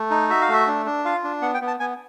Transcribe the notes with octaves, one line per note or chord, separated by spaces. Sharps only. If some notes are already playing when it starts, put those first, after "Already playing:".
Already playing: A3
D#4
F#4 E5
F5
A3 E5
D4
D4
F4 F5
D4
B3 F#5
G5
B3
A5
B3 G#5